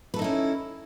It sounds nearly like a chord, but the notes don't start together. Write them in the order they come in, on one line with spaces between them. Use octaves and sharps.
B4 A4 D#4 E4 C#4